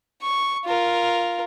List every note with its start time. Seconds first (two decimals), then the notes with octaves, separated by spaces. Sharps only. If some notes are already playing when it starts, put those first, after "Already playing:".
0.22 C#6
0.65 F4 A#4